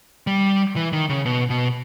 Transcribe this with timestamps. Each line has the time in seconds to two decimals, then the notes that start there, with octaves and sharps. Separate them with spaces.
0.27 G3
0.76 E3
0.93 D#3
1.09 C#3
1.26 B2
1.50 B2